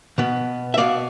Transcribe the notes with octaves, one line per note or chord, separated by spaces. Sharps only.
B2 B3
E5
B2 B3 D5 F5